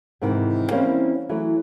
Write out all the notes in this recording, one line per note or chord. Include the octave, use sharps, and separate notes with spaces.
G#2 C3 D#3 E3
E3 G3 A#3 C4 C#4
E3 F#3 A3